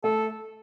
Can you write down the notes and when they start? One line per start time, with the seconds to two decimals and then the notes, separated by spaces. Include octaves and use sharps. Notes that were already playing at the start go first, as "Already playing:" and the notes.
0.04 A3 A4